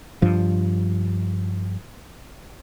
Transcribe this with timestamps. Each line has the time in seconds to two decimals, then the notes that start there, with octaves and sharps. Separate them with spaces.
0.22 G2 F3